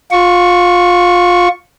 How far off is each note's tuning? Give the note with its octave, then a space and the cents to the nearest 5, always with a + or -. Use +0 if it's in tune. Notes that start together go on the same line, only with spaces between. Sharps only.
F4 +20 C#6 +0